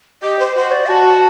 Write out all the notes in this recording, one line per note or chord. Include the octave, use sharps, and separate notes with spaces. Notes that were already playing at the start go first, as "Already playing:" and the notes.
G4 D#5
C5
F#4 C5
D5
F#4 A5